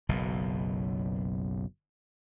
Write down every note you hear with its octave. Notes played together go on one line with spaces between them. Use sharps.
F#1 B1 B2